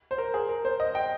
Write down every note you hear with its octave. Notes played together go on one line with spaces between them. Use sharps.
C5
A#4
G#4
A#4
C5
D#5
G5